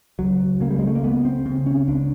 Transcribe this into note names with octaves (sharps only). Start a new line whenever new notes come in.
C#2 F#3
C#3 A#3
G3
G#3
A3
A#3
C#2 B3
C4
C#3 C4
C#4
C#2 D4